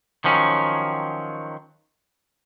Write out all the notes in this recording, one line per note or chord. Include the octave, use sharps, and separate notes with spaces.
D#3 F3 F#3 C#4